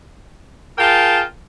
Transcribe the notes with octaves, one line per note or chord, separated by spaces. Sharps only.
F4 G#4 A#4 G5 A5